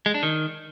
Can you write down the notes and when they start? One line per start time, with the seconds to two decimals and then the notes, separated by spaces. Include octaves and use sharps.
0.06 G#3
0.14 D4
0.23 D#3